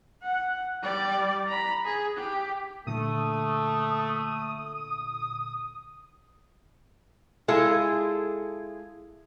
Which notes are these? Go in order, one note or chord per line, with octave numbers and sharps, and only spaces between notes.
F#5
G3 D5
A#5 B5
G#4
G4
A#2 D3 A3 D#6
G#3 E4 F4 G#4 A4